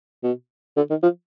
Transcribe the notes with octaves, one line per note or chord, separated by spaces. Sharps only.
B2
D3
D#3
F3